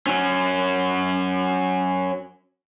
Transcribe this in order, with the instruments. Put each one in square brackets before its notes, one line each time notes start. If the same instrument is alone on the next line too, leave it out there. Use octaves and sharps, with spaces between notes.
[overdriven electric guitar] F#3 C#4